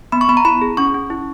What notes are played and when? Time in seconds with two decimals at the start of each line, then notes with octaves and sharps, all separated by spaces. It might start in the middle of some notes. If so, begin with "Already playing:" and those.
0.12 B3 B5
0.21 C#6
0.29 B3 B5
0.37 A#5
0.45 E4 B5
0.61 G#4
0.77 C#4 C#6
0.94 C#4
1.10 E4